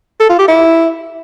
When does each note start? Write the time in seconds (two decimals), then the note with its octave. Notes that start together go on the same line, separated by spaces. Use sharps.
0.20 A4
0.30 F4
0.39 G4
0.48 E4